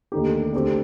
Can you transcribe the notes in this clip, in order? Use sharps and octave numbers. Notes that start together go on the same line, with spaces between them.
D#2 D3 A3 D#4 G4
D3 A3 C4 G4